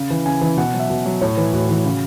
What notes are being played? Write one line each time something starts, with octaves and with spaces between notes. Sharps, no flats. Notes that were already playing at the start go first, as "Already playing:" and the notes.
Already playing: C#3
E3
C#3 G#5
E3
B2 F#5
F#3
E5
B2
F#3
A2 C#5
E3
A2 F#4
E3
C#3